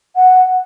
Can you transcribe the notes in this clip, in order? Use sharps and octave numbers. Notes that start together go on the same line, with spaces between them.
F#5